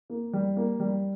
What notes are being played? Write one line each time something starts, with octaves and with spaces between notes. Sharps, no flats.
A#3
G3
A#3
G3